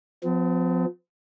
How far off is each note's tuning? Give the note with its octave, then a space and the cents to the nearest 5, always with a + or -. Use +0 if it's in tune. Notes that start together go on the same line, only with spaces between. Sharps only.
F3 +20 C4 -45